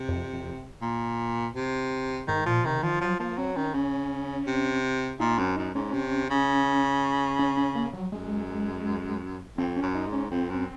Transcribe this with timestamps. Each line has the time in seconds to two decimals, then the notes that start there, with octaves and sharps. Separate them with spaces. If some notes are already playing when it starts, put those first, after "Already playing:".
Already playing: C3
0.08 F2
0.33 F2
0.82 A#2
1.55 C3
2.28 G#2 D#3
2.46 A#2 F3
2.64 C3 D#3
2.83 D#3 F3
3.01 F3 F#3
3.20 F3 A#3
3.38 F#3 C4
3.56 D#3 C#4
3.74 C#3 C#4
4.47 C3
5.20 A#2 D#4
5.38 F#2 C4
5.56 F#2 D#4
5.74 G#2 C#4
5.94 C3
6.30 C#3
7.39 C#4
7.57 C#4
7.75 A#3
7.93 F#3
8.12 F#2 G#3
9.58 F2 C4
9.76 C#4
9.82 F#2
9.95 D#4
10.07 G#2
10.12 C#4
10.31 F2 C4
10.49 F#2